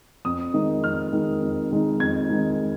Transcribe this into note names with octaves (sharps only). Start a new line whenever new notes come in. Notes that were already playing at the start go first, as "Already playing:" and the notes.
F2 D#6
D#3 G#3 D#4
F2 F6
D#3 G#3 D#4
F2
D#3 G#3 D#4
F2 G#6
D#3 G#3 D#4